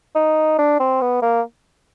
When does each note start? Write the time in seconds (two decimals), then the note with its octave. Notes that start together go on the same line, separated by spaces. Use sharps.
0.15 D#4
0.58 D4
0.80 C4
1.01 B3
1.22 A#3